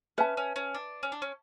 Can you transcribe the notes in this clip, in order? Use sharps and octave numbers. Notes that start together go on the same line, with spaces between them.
C#4 B4 E5 A5
C#4
C#4
D4
C#4
D4
C#4